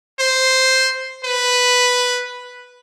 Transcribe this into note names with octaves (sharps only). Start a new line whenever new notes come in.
C5
B4